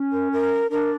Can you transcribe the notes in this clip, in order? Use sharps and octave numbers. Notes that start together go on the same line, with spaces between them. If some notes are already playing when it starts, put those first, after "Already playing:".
Already playing: C#4
A#4
A#4
D4 A#4